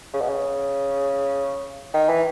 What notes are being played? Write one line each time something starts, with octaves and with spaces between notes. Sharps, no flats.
C#3
B2
C#3
D#3
E3